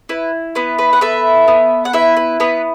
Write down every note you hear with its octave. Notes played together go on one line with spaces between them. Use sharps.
E4 B4
B3 B4
B4
F#5
A4 B4 E5
B3
F#5
E4 B4 E5
B4
B3 B4